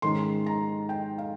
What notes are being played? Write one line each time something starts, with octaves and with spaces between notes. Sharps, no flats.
G#2 D#3 G#3 C#4 C6
A#5
G5
F5